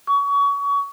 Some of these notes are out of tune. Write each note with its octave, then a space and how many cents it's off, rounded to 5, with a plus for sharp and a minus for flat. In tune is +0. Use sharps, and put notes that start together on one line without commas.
C#6 +30